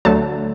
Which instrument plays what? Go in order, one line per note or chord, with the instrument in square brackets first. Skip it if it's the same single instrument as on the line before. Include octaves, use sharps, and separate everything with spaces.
[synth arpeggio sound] D2 D3 F#3 A3 A5